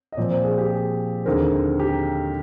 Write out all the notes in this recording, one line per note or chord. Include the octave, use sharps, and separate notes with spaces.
D#5
A#2 F3 C4 D5
C5
G#4
G4
G#4
D#2 D3 G#3 C4 A#4
G4